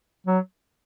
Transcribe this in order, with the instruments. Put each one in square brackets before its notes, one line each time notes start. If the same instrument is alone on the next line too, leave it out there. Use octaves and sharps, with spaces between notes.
[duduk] F#3